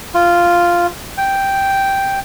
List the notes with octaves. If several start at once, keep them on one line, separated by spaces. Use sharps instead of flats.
F4
G5